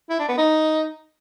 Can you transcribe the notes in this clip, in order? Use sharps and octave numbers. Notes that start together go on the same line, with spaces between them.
E4
D4
B3
D#4